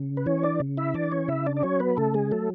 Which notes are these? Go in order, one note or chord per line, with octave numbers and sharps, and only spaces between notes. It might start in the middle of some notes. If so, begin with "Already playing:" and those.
Already playing: C#3
B4
E3 C#4 C#5
D4 D5
C#3
E4 E5
E3 D4 D5
C#4 C#5
C#3 E4 E5
D4 D5
D5
F#3 C#4 C#5
B3 B4
C#3 A3 A4
G#3 G#4
F#3 A3 A4